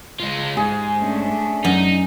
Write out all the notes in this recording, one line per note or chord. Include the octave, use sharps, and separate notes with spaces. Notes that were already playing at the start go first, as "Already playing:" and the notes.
G#3 F4
G#2 G#4
A3 C#4 D4
F#2 D#4